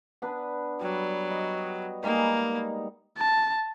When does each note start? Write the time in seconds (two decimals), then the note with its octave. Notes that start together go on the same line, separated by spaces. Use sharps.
0.22 B3 D4 B4
0.81 F#3 G3
1.30 D#5
2.03 G3 G#3 A#3 D#4
3.17 A5